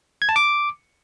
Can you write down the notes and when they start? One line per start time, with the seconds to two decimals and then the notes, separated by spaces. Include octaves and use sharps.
0.22 G#6
0.29 A5
0.36 D6